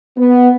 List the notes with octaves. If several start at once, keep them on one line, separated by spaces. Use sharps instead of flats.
B3